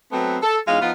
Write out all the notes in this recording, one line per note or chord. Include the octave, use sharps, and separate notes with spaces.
F#3 A3 B3 C4
A4
E2 G#3 C#4 D#4 F4 F5
F3 B3 D#4 F4